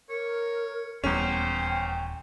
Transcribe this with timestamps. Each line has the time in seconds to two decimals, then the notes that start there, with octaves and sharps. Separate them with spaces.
0.09 A#4 C#5
1.04 D#1 E2 E3 G3 C#4 C5 G5